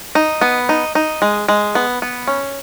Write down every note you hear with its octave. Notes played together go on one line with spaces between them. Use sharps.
D#4
B3
D#4
D#4
G#3
G#3
B3
B3
C#4